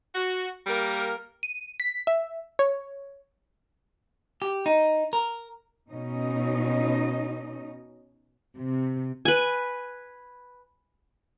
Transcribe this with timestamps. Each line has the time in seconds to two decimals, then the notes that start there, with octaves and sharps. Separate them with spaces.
0.14 F#4
0.66 G3 A#3 A#4
1.43 D#7
1.80 B6
2.07 E5
2.59 C#5
4.42 G4
4.66 D#4
5.13 A#4
5.91 B2 C#4 D#4 D#5
8.56 C3
9.25 B4 G#5